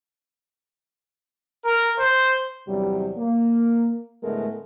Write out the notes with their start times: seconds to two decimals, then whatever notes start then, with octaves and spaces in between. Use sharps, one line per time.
1.65 A#4
1.97 C5
2.68 E2 G2 C3 F#3 G3
3.17 A#3
4.23 A2 D3 G#3 A3 B3 A#4